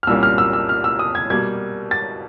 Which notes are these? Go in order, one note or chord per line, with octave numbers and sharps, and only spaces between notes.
F6
C2 A#2 G3 A#3 C#4 E6
F6
E6
E6
F6
E6
D#6
G#6
B2 G3 A#3 G#6
A6